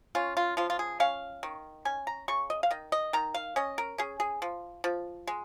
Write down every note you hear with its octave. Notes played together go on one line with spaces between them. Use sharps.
C#4 F4
F4
F3 F4
F4
G#4
C#4 F5
D#3
C#4 G#5
A#5
C#3 C#6
D#5
F5
D#3 D#5
D#5
D#3 A#5
F5
C#4 D#5
A#4
C#4 G#4
G#4
F3
F3
G#3